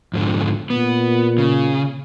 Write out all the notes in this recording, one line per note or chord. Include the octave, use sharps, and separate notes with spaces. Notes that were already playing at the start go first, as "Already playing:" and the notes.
F2 G#2 D3
A#2 B3
C#3